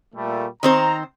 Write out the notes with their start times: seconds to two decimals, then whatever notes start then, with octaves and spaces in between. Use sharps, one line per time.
0.15 A#2 G3 A3
0.63 D#3 C4 C5 A#5